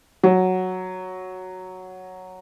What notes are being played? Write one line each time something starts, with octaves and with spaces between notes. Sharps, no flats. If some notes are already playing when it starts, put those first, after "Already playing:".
F#3